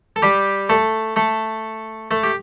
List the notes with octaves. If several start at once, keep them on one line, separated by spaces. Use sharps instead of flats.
A4
G3 G4
A3 A4
A3 A4
A3 A4
G4